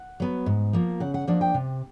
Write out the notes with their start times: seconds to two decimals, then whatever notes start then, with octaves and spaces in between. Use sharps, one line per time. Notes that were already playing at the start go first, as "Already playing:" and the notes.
Already playing: F#5
0.20 F#3 B3
0.46 G#2
0.73 F3 A#3
1.00 C#3 F#5
1.14 F#5
1.27 F3 A#3 D4 F#5
1.41 G5
1.54 C3